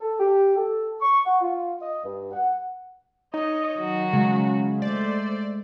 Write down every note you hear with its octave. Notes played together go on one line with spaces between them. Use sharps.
A4
G4
A4
C#6
F#5
F4
D#5
G2
F#5
D#4 C#5 D#5
D#3 F#3 F#4
C#3 G#3
A3 C5 D5